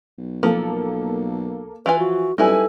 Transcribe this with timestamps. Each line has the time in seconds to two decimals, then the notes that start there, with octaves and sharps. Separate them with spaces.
0.18 B1
0.43 F3 A#3 A4
1.86 E3 F4 B4 G#5
1.99 F3 F#4
2.38 F#2 G3 D#4 E4 A4 B4 G#5